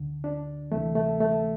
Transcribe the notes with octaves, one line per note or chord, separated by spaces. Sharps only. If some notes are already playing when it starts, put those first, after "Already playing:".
Already playing: D2 D3
D4
D2 C3 E3 A3
A3
A3